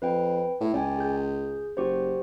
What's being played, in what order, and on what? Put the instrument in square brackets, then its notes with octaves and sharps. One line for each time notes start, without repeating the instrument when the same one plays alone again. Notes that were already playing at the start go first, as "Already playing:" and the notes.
[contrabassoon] F2 [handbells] B4 G5
[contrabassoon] A2
[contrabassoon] C#2 [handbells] D5 G5 G#5
[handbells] G#4 G6
[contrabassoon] F#1 [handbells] F#4 G4 C5